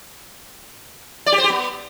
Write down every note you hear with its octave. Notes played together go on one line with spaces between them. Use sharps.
D5
G4
C5
G4
B3